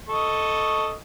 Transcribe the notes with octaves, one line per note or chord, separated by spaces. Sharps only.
A4 D#5 C#6